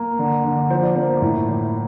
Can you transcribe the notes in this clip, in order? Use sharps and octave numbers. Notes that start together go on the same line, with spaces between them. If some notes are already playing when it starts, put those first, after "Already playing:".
Already playing: A#3
D3
D3
F3 C5
D5
A#3 C5
A2
A2